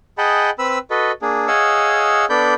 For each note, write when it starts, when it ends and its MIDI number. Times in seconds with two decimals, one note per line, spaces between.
0.18 0.50 68
0.18 0.50 75
0.18 0.50 78
0.18 0.50 79
0.18 0.50 81
0.18 0.50 83
0.59 0.78 60
0.59 0.78 71
0.59 0.78 83
0.59 0.78 88
0.91 1.12 66
0.91 1.12 69
0.91 1.12 71
0.91 1.12 75
1.22 1.48 58
1.22 1.48 62
1.22 1.48 68
1.48 2.25 68
1.48 2.25 73
1.48 2.25 75
1.48 2.25 77
1.48 2.25 78
1.48 2.25 88
2.30 2.54 59
2.30 2.54 62
2.30 2.54 69
2.30 2.54 74
2.30 2.54 83
2.30 2.54 91